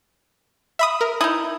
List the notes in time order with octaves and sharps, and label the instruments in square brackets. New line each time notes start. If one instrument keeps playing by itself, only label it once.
[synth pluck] E5 B5 D#6
A#4
[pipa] D#4 E4 [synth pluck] D#6